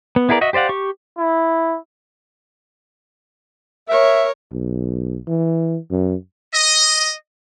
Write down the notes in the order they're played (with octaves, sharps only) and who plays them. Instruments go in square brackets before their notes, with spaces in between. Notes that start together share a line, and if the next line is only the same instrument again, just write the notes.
[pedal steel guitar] B3
B3 E4 G#4 A#4 D5
F#4 D#5 E5
G4 C5 D5 F5 F#5
G4 C#6
[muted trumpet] E4
[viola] A#4 C#5 [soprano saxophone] E5
[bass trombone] B1
E3
F#2
[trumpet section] D#5